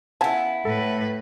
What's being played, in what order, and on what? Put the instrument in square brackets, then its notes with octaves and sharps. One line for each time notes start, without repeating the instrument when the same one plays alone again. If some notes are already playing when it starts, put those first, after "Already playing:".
[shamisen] C#3 G#5 A5 [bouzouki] B3 E4
[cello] A2 B4 [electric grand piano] A4